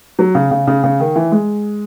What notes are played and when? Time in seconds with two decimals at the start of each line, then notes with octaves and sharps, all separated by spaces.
0.19 F#3
0.35 C#3
0.51 C#3
0.67 C#3
0.84 C#3
1.00 D#3
1.16 E3
1.32 G#3